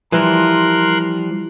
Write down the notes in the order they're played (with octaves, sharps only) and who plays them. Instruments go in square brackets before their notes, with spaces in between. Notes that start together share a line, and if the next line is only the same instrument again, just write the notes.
[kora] E3 [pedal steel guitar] F3 G3 [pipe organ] A#4 C6 F#6